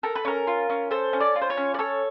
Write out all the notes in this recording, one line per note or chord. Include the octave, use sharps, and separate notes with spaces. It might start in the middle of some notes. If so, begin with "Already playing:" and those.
A4 A#4
B4
C#4 A#4
F4
C#4
A4 C5
C#4
D5
F4
C5
C#5
C#4
D5
A4 C#5